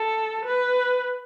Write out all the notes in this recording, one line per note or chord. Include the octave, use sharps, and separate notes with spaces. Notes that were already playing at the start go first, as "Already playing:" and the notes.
Already playing: A4
B4